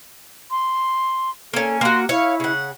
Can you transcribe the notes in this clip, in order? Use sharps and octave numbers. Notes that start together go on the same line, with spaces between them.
C6
A#3 C#4 A4
A#3 F#4 C6
E4 C#5 F5
C#3 F#5